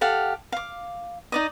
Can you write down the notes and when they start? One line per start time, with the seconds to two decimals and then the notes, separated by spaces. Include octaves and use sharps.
0.01 G4 A4 F5 F#5
0.52 F5 D6
1.32 D#4 D5 D#5